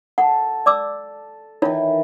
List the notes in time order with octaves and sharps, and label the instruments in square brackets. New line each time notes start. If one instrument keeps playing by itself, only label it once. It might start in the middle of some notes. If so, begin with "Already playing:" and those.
[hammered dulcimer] A4 [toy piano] F#5
[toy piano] D5 D6 E6
[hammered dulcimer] D#3 E3 [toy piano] E4 F4 C#5